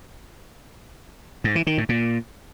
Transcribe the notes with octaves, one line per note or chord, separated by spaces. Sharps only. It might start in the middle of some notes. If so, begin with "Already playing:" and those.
G#2
E3
D#3
A2
A#2